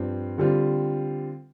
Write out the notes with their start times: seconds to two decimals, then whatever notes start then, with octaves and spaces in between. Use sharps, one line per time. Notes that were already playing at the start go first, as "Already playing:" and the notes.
Already playing: G2 F3 C4
0.38 D3 G3 C4 F4